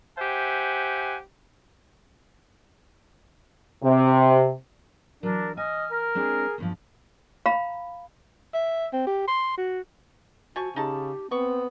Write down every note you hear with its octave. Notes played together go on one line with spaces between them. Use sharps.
G4 C5 E5 F#5 G#5
C3
E3 F#3 D4 A#4
D#5 G#5 F6
A#4
G#3 C4 D4 G#4
E2 G2 F3
F5 A#5 B5
E5
C4
G4
C6
F#4
F3 F#4 G#5 C#6
C#3 D#4 G4 A5
B3 C4 C#6